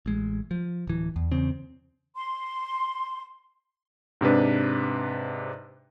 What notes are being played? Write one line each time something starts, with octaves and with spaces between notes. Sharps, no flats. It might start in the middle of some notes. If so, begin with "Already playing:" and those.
A1 G#3
F3
D1 E3
E2
E2 C#3 C4
C6
G#2 C3 D4 B4